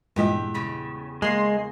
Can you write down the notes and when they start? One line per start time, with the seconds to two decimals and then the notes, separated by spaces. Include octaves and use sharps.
0.16 E2 G2 A#2 G#3 G4 E5
0.54 C#3 B5
1.22 G#3 A#3 G#4 C6 C7